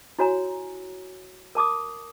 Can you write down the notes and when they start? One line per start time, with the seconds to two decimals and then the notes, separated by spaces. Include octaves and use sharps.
0.19 E4 F#4 C#5 G#5 A#5
1.55 A#4 A5 D6 D#6